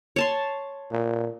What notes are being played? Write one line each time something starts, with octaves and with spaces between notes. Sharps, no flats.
C#5 A5 C6
A#2